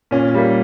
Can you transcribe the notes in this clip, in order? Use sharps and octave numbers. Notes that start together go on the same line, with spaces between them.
A#2 C#4
G3 A#3